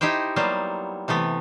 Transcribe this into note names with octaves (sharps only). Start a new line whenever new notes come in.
D#4 E4 G4 C5 G5
F#3 G3 A#3 B3 C5
C3 E3 A3 B3